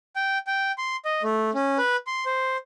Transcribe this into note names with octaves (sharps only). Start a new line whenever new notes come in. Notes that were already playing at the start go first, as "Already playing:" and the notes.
G5
G5
C6
D#5
A3
C#4
B4
C6
C5